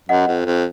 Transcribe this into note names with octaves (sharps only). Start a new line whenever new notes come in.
F#2 D#5 F#5
F2
F2